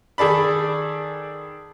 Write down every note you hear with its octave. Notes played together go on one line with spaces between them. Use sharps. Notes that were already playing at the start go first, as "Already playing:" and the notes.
D#3 G#4 A4 D5 B5